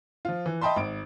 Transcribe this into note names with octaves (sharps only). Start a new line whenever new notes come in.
F3 F4
E3
D#5 E5 G5 A5 B5 C6
G#1 D7